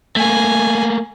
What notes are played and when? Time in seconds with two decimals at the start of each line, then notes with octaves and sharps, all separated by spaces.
0.16 A3 A#3 G#5